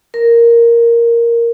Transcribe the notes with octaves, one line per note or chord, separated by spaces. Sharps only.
A#4